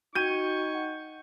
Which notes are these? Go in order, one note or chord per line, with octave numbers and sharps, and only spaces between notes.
D#4 F#4 G5 C#6 G6 G#6 D#7
F#5